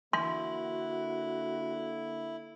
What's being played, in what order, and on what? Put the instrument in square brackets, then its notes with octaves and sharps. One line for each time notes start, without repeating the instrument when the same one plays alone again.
[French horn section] D3 A#3 [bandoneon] E4 [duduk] F#4 [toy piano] C6